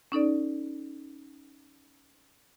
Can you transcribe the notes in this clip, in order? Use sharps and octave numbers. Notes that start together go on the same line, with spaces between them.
C#4 D#4 A4 D5